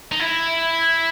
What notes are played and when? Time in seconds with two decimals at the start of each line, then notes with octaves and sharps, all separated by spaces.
0.12 D#4
0.20 E4